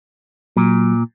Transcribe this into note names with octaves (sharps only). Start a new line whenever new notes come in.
A#2 F#3